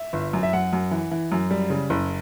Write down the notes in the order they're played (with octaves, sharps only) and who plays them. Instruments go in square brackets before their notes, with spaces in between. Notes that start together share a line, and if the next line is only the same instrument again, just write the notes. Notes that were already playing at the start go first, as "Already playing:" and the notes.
Already playing: [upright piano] E5
G1
F#2
E5
F#2 F#5
F#2
E3
E3
F#2
G3
C#3
F#1